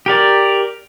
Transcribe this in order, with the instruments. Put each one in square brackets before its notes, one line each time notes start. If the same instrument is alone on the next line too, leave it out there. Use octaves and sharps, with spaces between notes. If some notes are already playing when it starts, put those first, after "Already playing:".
[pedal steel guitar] G4 A#4 D5